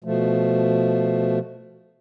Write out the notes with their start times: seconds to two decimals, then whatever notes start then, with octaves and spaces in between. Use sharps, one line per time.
0.04 B2 F3 A3